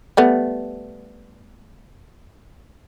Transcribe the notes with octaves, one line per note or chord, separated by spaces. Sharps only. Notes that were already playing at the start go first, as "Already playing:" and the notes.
G3 A3 B3